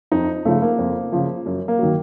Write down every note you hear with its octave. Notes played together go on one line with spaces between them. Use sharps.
F2 D#4
C#3 F3 A3
A#3
F2
C#3 F3
F#2
A#3
D#3 F#3